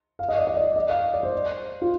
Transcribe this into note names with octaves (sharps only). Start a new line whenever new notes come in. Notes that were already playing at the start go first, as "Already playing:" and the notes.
F5
D#5
D5
D#5
D5
D#5
F5
D5
C5
F4